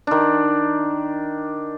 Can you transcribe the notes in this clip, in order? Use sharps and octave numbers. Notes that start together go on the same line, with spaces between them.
D#3 D4